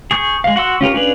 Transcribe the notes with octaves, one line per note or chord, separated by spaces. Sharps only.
G#4 C#6 G6
G#3 F5
F#4 F#5 C6 E6
C#4 F4 G4 A#4
C#4 D4 F4 G#4 B4